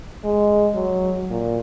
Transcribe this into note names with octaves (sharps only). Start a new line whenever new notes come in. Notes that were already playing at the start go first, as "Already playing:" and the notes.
G#3
F#3
A#2